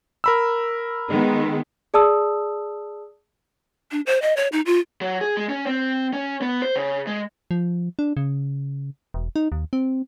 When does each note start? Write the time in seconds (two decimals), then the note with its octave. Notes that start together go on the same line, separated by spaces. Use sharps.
0.24 A#4 B5 E6
1.09 D#3 G#3 B3
1.94 G#4 D5 A5 D#6 E6
3.92 D4
4.06 C5
4.22 D#5
4.37 C#5
4.52 D#4
4.66 F4
5.01 F#3
5.21 G#4
5.37 G#3
5.49 C#4
5.67 C4
6.13 C#4
6.42 B3
6.62 C5
6.76 C#3
7.07 G#3
7.51 F3
7.99 D4
8.17 C#3
9.14 E1
9.36 D#4
9.52 D#2
9.73 C4